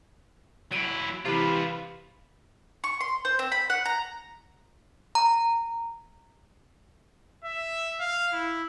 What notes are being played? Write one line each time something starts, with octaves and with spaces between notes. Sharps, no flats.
F#3 E4 D7 D#7
C3 E3 F4 B4
C#6
C6
C5
C4
B5
F#5
A#5
A#5
E5
F5
E4